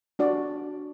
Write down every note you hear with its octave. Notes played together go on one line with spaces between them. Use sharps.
D4 F#4 D5